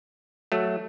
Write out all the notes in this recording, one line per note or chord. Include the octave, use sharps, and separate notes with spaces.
F#3 A3